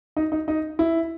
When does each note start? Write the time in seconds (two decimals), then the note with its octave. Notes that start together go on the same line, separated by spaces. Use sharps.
0.17 D#4
0.32 D#4
0.48 D#4
0.79 E4